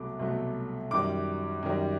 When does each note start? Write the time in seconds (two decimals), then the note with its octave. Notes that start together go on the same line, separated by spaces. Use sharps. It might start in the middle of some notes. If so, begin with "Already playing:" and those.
Already playing: C2 B2 F#3 A3 D6
0.19 C2 B2 F#3 A3
0.91 F#2 D#3 G3 D6
1.63 F#2 D#3 G3